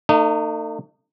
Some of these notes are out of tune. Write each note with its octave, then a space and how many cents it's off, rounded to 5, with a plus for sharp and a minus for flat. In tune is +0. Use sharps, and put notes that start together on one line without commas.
A3 +45 D#4 -25